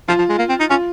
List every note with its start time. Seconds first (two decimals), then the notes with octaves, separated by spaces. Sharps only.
0.08 F3 F4
0.19 F3
0.29 G#3
0.39 A#3
0.49 C4
0.60 D#4
0.70 C#4 F4